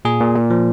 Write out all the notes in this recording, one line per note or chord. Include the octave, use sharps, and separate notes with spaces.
A#2 G#4
A#2
A#2
F3